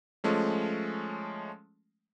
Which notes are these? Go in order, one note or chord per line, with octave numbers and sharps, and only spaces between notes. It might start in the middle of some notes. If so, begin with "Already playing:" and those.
F3 G#3 A3 C#4